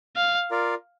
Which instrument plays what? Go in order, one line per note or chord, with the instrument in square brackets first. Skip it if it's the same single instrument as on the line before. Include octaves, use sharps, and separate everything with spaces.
[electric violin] F5
[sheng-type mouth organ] F4 A#4 D5 F5